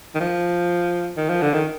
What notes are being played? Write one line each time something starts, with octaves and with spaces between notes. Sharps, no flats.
D#3
F3
D#3
F3
D3
D#3